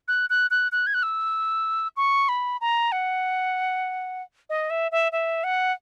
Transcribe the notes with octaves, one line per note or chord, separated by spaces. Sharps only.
F#6
F#6
F#6
F#6
G#6
F#6
E6
C#6
B5
A#5
F#5
D#5
E5
E5
E5
F#5